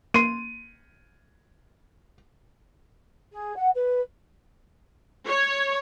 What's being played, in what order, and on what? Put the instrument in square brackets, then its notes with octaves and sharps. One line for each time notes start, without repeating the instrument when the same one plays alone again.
[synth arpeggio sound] A#3 C6 [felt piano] D#7
[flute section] G#4
F#5
B4
[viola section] C#5